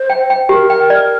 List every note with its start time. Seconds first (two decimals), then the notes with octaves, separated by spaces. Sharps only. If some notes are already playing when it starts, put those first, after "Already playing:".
Already playing: C5
0.10 G5
0.30 G5
0.49 G4 A#4
0.70 G5
0.90 D5